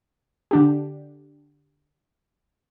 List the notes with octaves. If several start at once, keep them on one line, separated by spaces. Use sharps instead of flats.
D3 D4 G4